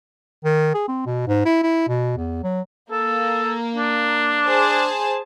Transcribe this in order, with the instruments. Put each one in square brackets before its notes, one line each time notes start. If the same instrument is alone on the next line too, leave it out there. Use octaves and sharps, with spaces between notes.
[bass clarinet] D#3
G#4
C4
B2
G#2
E4
E4
B2
E2
F#3
[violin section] A#3 [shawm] A4
[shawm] D4
[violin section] G#4 C5 A5